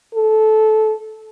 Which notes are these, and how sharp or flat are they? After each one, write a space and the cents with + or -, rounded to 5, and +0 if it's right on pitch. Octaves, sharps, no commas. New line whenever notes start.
A4 -15